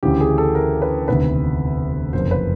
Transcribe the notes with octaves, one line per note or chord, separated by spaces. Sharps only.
D2 C#3 E3 G4
G#4
A4
A#4
B4
E1 D2 C3 D#3 B4
F#1 F2 C3 C5
B4